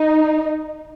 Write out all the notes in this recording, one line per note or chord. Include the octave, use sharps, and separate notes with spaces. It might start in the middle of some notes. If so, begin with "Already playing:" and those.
Already playing: D#4